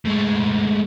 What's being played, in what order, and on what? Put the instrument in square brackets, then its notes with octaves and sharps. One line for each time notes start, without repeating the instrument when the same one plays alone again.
[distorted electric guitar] A2 G#3